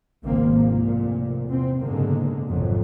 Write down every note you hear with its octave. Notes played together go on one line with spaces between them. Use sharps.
G#1 C#2 G#2 B2 A#3 C4
C2 G#2 F3 A#3
F1 A#2
E2 C3 C4
F#1 G#2 B2 D3 G#3 A#3
G#1 F2 C3 F#3